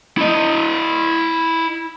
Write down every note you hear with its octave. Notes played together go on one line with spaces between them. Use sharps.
E4 D#5